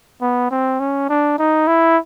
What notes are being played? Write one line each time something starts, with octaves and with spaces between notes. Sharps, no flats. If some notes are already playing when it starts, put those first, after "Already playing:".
B3
C4
C#4
D4
D#4
E4